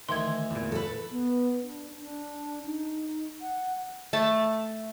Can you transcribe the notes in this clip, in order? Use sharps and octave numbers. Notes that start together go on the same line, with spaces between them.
D2 D#3 E3 C6 D#6 G#6
E2 A#2
A4 B4
B3
D4
D4
D#4
F#5
A3 A5